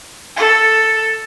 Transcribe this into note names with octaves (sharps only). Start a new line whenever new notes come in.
A4